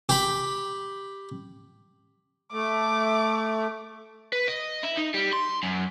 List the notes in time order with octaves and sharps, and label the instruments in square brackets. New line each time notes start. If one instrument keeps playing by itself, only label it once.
[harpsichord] G4 B5
[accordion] A3 [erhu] D6
[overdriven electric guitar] B4
D#5
E4
D#4
G3
C6
F#2